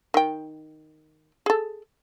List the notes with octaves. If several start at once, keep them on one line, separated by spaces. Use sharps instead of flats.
D#3 G5
G#4 A4